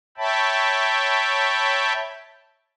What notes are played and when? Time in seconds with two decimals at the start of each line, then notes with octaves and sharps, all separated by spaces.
0.18 C#5 E5 G5 A5 B5